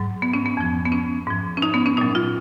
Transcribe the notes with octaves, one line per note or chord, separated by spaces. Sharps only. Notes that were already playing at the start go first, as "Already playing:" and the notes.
Already playing: G#2 F#3
B3
C#4
B3
F2 F3
B3
C#4
G#2 F3
C#4
D#4
B3
C#4
A#2 F#3 D#4
F4